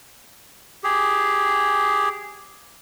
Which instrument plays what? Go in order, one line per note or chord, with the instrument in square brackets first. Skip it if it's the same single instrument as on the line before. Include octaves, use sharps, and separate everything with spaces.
[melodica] G4 G#4